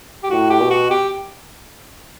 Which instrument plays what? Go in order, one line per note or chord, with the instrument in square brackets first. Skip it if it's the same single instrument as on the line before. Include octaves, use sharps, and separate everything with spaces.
[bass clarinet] G4
[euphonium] A2 [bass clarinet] F#4
[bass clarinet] G4
[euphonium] B2
[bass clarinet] F#4
G4